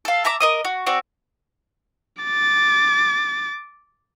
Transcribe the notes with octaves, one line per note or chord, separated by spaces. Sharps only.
A4 F5
E5 A5 A#5 D6
A#4 D#5 D#6
F#4
C4 F#4 D5
D6 A6